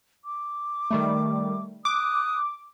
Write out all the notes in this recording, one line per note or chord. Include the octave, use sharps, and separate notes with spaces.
D6
D#3 G3 A3
D6 D#6 F#6